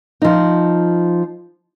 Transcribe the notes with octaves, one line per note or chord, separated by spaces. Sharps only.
F3 D#4